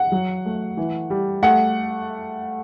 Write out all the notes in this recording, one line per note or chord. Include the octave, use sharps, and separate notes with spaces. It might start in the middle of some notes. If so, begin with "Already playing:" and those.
Already playing: F#5
F#3
A3
E3
G3
A3 F#5